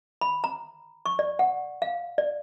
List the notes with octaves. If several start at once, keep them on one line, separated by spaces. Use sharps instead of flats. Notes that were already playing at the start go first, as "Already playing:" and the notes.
B5
A#5
C#6
D5
F#5
F5
D5